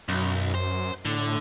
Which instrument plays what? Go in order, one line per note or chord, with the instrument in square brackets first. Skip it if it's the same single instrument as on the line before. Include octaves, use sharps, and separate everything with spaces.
[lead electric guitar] B1 [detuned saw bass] F#2
[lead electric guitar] C5
[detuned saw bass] A2 [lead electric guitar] D3